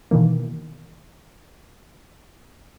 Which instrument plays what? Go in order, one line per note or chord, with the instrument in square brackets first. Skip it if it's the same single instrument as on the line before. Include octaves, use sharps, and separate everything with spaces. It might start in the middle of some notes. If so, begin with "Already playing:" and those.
[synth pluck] B2 D#3 E3 A#3